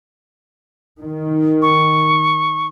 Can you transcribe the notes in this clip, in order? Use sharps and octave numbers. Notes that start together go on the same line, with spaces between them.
D#3
C#6